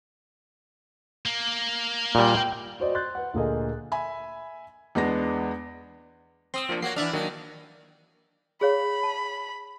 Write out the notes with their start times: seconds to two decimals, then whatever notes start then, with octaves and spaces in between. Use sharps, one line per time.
1.26 A#3
2.15 A#2 G3
2.37 G5
2.80 F#4 C5 D5 D#5
2.95 C6 F#6 G6 A6
3.15 B4 F#5
3.34 D2 A#2 A#3 G#4 A4 D#5
3.92 E5 G#5 B5
4.95 E2 G#3 B3 D4 A#6
6.54 C4 C6 D#6 E6
6.69 F3 A#3 D4
6.82 A#3 F#4 C#5 C7
6.96 E3 D4 D5 E5 F6
7.13 D#3 F#3 A#3 D4
8.61 G#4 C#5 F5 B5
9.03 A5